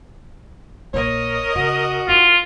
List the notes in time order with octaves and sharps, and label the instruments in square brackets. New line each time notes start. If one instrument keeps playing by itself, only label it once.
[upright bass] A#1 [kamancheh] A#4 D#5 [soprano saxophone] C#5
[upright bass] C#3 [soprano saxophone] F#4
[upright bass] E4 [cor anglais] F4